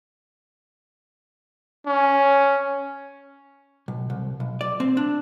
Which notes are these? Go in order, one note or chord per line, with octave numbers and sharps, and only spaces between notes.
C#4
B1
C2
B1
D5
C4
D4